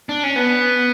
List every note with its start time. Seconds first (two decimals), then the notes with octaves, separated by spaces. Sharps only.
0.09 D4
0.24 C#4
0.36 B3